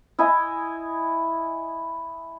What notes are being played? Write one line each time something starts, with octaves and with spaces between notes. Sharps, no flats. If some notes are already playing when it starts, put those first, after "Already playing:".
E4 D#5 G#5